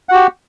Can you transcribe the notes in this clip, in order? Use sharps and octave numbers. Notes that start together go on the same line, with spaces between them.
F#4 G4 F#5